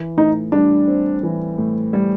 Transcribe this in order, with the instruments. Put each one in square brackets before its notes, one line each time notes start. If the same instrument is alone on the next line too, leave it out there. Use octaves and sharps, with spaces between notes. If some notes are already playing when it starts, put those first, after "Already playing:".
Already playing: [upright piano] E3
[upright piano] A2 [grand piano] D#4
[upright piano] G3 [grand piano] D4
[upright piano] C4
E3
A2
G3